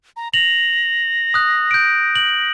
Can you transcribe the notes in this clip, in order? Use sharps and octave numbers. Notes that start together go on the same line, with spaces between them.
A#5
A#6 F7 F#7
D#6 F#6
G6 D7
F#7